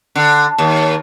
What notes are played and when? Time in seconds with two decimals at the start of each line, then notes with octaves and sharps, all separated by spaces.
0.15 D3
0.58 D#2